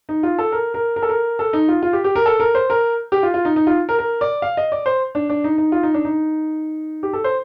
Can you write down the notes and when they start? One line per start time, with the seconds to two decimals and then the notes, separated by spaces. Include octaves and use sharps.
0.09 D#4
0.23 F4
0.38 A4
0.52 A#4
0.74 A#4
0.96 A#4
1.02 A4
1.09 A#4
1.39 A4
1.53 D#4
1.68 F4
1.83 F4
1.93 G4
2.04 G4
2.16 A#4
2.26 A4
2.40 A#4
2.55 C5
2.70 A#4
3.12 G4
3.23 F4
3.34 F4
3.45 D#4
3.56 D#4
3.67 F4
3.89 A#4
3.99 A#4
4.21 D5
4.42 F5
4.57 D#5
4.72 D5
4.86 C5
5.15 D4
5.30 D4
5.44 D#4
5.58 D#4
5.72 F4
5.83 D#4
5.94 D4
6.05 D#4
7.03 G4
7.13 A4
7.24 C5